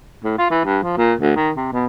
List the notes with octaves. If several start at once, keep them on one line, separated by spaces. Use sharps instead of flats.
A2
F4
E3
G2
F3
A#2
D2
D#3
C3
B2